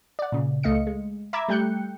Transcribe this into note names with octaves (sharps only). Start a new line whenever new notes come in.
D5 F#5
A#2 C#3
C#2 A3 D#5 F5 C#7
G#3
E5 A#5 B5 D6 E6 G#6
G3 A3 G5 F#6 G6 C#7